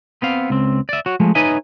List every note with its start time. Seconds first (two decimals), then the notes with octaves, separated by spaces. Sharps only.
0.22 B3 C4 F5
0.50 C#2 C4
0.89 D5 E5
1.06 F#4 C#5
1.20 F3 G#3 A3
1.35 D#4 B4 C#5 D#5 E5 G#5